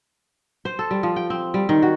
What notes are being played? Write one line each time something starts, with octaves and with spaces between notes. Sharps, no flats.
C5
A4
G3
F3
G5
C4
G3
D#3
F#4